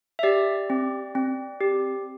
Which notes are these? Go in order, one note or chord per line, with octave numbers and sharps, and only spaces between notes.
E5
G4 D5
C4
C4
G4